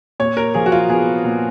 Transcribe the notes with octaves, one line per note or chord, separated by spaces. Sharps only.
A#2 C#5
A#4
F3 G#4
F#4
F4
B3 G#4
A#2